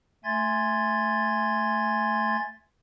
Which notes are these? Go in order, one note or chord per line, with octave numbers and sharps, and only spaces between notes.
A3 E5 G#5 C6 G#6 A6